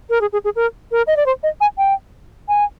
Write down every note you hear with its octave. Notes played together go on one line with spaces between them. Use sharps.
A#4
G#4
G#4
G#4
A#4
A#4
D#5
D5
C5
D#5
G#5
G5
G#5